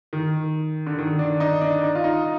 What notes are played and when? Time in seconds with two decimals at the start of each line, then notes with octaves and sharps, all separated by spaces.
0.13 D#3
0.86 D3
0.98 D#3
1.19 D4
1.40 D#4
1.61 D4
1.83 D#4
1.95 F4
2.04 D#4